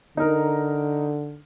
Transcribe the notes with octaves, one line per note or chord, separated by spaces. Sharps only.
D3 D#4 A#4